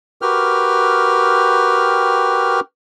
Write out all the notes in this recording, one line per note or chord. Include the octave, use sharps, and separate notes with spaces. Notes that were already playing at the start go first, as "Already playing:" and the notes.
F#4 G4 A#4 B4 G5 F6